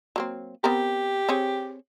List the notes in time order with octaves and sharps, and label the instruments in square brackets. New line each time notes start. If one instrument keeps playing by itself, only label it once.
[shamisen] F#3 A#3 C4
[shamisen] B3 C4 A#4 [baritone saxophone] G4
[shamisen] C4 G#4 C#5